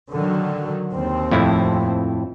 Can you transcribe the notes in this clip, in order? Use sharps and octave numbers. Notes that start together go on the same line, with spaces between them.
D3 D#3 F#3
D#2 C4
F2 A2 E4